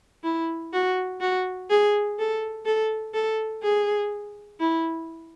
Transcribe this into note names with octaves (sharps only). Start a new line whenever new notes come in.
E4
F#4
F#4
G#4
A4
A4
A4
G#4
E4